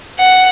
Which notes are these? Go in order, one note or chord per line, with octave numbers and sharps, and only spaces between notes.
F#5